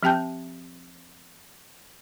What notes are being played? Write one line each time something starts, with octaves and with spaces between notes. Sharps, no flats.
F3 C4 G4 G5 A5 G6